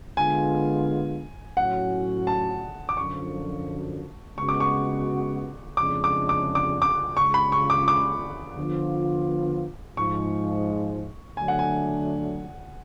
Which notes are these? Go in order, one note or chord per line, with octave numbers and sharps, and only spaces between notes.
D3 G#3 B3 F4 G#5
A2 F#3 C#4 F#4 F#5
A5
D6
F#2 D3 F3 C#6
C#3 G#3 B3 F#4 C#6
D6
C#6
F2 C#3 G#3 D4 D6
D6
D6
D6
D6
C#3 G#3 C#4 F4 C#6
B5
C#6
D6
D6
D3 F3 B3 F4
G#2 F3 G#3 C#6
D3 F#3 A3 D4 G#5
F#5
G#5